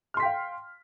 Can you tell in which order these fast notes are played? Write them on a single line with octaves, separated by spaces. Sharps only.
F6 C6 B6 G5 F5